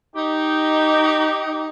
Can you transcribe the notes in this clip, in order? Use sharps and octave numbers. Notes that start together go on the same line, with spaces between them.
D#4 G4